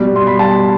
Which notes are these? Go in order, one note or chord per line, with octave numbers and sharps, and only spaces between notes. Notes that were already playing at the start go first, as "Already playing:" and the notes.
Already playing: B2 G3
C6
B5
A5